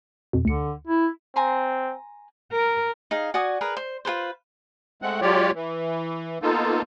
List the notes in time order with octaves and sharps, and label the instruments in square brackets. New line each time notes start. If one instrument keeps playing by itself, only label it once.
[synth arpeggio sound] F2 B2
[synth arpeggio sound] D2 C#7 [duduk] D3
[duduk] E4
[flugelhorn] C4 [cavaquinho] G#5 A#5 C6
[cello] A#4
[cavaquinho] D#4 G#4 F5
F#4 D5 G#5 D#6
G#4 A#4 B4
C5
F4 A4 B4 C5
[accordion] G#3 A3 C4 F#5
F#3 G#3 F4 G4 C#5 D5
E3
A#3 B3 D#4 F4 A4